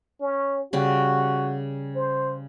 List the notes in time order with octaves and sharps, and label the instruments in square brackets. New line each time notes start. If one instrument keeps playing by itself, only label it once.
[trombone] C#4
[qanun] C#3 G3 [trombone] F#4
[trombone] C5